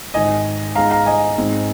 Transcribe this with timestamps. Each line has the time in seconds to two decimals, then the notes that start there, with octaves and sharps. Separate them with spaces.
0.14 G#1 G#2 D#3 D#5 G#5
0.75 G#2 G#3 D#4 F5 A#5
0.91 F5 A#5
1.06 D#5 G#5
1.37 G#1 G#2 G#3 C4 D#4